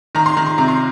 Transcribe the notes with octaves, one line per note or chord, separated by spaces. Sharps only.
D#3 A#5
C6
D#3 A#5
C6
C3 A#5
C6